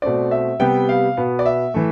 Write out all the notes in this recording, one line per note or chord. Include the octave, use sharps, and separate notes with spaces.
B2 A3 C4 D5
E5
C3 G3 B3 G5
F5
B2 B3
D5
E5
E3 A3